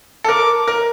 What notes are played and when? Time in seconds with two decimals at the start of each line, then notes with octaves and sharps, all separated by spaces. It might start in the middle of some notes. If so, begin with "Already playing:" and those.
0.24 A4
0.29 A#4 D6
0.68 A#4